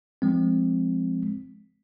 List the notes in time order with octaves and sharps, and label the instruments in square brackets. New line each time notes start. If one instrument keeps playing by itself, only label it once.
[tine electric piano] F3 G#3 C4